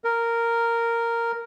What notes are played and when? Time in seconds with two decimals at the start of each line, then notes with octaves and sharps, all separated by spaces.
0.04 A#4